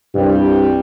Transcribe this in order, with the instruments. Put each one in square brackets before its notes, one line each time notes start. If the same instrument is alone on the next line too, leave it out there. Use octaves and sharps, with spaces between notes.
[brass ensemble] C2 G3 [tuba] G2